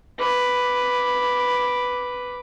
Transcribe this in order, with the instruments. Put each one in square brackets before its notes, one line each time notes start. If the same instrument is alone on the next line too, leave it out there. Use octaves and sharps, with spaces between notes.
[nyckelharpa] B4 D6